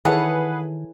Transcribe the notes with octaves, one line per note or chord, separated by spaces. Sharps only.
D#3 E3 G#4 A4 B4 C#5 F#5